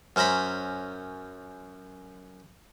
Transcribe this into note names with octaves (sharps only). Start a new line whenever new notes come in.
F#2 C#4 C5 A#5 B5